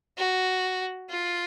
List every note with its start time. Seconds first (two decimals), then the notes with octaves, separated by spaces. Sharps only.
0.17 F#4
1.10 F4